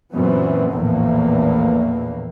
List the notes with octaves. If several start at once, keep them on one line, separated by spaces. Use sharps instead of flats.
F#2 A#2 E3 F#3 B3 C4
A#1 E2 A2 E3 A#3